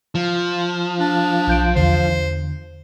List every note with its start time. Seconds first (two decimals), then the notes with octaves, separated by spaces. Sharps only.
0.15 F3
0.99 D4
1.47 B1 G6 D7
1.76 E2 D3 C5